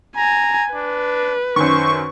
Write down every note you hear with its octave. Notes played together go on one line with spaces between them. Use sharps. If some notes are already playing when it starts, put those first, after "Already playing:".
G#5 A#5
D4 B4
F#2 D#3 C5 C#6